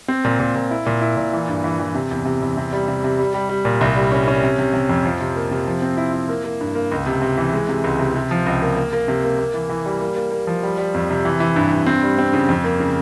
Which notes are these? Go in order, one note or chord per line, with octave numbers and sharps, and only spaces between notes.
C4
A#2
A#2
A#2
E4
A#2
E4
A#2
E3
G2
E3
E3
C3
E2
C3
E2
C3
G3
C3
C3
G3
G3
G3
A#2
C2
G3
C#4
C#4
C3
C3
C3
F2
F3
C3
A#3
C3
F3
C4
E4
E4
A#3
A#3
G2
A#3
C#2
C3
C3
E3
G#3
C3
C#2
C3
C3
F3
C#2
A#3
A#3
A#3
C3
A#3
A#3
E3
E3
G3
A#3
A#3
A#3
F3
G3
G3
F2
C3
E3
E3
G2
G2
C4
G3
C4
C#3
F2
A#3
C#3